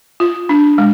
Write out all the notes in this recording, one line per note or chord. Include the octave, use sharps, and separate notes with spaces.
F4
D4
G#3